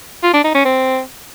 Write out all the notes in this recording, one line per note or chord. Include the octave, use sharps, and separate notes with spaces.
F4
D4
D#4
C#4
C4